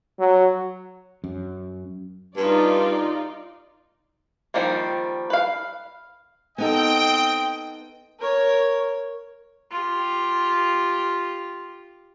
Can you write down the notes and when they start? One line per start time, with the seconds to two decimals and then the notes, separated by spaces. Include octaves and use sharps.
0.19 F#3
1.24 F#2
2.36 G2 D#4 F4 D5
4.54 D#3 F3 G3 A#3
5.30 B4 F5
6.58 B3 C4 D#4 A4 D#5 G5
8.19 A#4 C#5
9.71 F4 G4